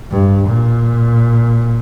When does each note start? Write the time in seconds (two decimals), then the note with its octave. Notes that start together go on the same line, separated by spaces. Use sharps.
0.11 G2
0.48 A#2